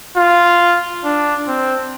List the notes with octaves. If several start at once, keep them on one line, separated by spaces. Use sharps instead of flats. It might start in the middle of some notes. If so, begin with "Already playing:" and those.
F4
D4
C4